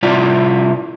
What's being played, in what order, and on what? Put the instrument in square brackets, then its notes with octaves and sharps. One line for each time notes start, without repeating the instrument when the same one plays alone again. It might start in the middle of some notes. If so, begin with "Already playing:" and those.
[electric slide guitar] C3 G3 E4 F4 D5